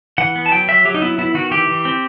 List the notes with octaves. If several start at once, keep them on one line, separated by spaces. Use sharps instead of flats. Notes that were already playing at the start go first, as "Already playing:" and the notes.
E3 F#5
B3
A5
F#3 G5
F#3 E5
F#3 G4
D#4
B3 E4
B3 E4
D#3 F#4
E3 G4
E3
C4